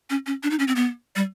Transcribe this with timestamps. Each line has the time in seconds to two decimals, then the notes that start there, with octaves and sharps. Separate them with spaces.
0.10 C#4
0.26 C#4
0.43 D4
0.51 D#4
0.59 C#4
0.68 C4
0.76 B3
1.16 G3